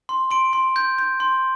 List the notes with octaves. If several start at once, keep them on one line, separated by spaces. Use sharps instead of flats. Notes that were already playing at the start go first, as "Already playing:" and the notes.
C6
C6 D7
C6
G6
G6
C6